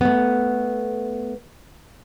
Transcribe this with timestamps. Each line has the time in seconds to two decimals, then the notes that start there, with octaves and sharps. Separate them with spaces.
0.01 A3 B3